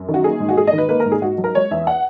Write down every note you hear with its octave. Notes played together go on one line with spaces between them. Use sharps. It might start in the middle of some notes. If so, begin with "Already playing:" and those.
Already playing: F#2
D#3
F#4
A#3 G#4
G#2
F#4
G#2 G#4
D#5
D#3
B4
A#3 B4
A#4
G#2
G#4
G#2 F#4
F#3
A#4
G#3 C#5
E2 E5
F#5